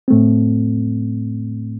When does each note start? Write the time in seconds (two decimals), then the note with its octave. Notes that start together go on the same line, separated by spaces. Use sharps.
0.08 A2 A3 C4